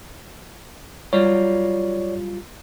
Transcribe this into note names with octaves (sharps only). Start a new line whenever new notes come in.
F#3 G3 F4 C#5 D5